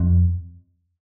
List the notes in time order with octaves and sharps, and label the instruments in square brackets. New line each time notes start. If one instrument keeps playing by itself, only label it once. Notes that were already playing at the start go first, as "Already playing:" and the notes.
Already playing: [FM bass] F2